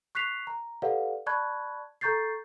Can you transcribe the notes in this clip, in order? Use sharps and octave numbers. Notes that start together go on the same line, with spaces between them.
C#6 F#6 B6 C7 F7
A#5
G4 A4 B4 D5 F5 F#5
D5 A5 B5 C#6 F#6 G#6
A4 A#5 C#6 G6 A6 C7